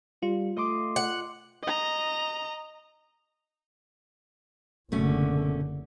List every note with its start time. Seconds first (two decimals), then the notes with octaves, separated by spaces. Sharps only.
0.22 G3 F4
0.57 A3 D#5 C6 D6
0.96 F#5
1.63 D#5 A#5
4.92 F#1 B2 D3 A3 C#4